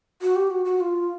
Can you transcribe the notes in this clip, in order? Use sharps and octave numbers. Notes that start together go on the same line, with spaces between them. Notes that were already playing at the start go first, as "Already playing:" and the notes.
F#4
G4
F#4
F#4
F4